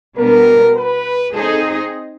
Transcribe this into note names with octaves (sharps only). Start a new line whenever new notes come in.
B2 G3 B3 D4 A#4
B4
C4 D#4 G#4 A4 C5 D#5